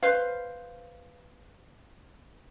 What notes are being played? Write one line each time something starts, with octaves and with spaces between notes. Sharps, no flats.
B4 C5 F5